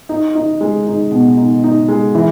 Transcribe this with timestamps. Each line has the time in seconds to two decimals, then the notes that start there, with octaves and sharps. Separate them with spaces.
0.09 D#4
0.35 D#4
0.61 G#3
0.87 D#4
1.11 B2
1.37 D#4
1.64 D#4
1.89 G#3
2.15 E3